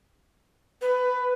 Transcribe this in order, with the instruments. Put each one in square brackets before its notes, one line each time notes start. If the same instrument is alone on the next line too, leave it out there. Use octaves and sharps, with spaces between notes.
[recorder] B4